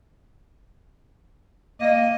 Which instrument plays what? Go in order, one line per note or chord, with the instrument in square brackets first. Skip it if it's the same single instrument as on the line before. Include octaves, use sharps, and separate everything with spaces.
[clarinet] A#3 [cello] D#5